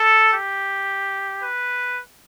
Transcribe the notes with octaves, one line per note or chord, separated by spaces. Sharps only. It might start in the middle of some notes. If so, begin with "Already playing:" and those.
Already playing: A4
G4
B4